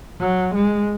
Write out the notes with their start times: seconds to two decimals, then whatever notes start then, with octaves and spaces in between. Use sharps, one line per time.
0.20 F#3
0.55 G#3